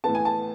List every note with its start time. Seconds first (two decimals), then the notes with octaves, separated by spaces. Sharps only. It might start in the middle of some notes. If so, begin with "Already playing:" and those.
0.04 A2 E3 B3 A5
0.15 G#5
0.25 A5